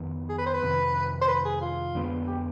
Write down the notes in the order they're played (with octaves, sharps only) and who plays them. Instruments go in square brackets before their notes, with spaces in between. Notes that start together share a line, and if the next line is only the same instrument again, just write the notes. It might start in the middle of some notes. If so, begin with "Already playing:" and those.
Already playing: [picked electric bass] F2 D#3 B3
[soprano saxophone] G#4
B4
C5
B4
[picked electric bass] F2 C3 D#3
[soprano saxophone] C5
B4
G#4
F4
[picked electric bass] F2 D3 G#3 B3
[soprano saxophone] G4